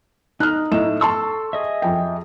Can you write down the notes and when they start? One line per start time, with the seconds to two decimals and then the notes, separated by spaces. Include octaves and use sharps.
0.40 D#4 F6 F#6
0.72 A2 D#5 E7
1.01 A4 A5 C6 C#6 E6
1.53 G#4 D#5 E5
1.82 F2 G5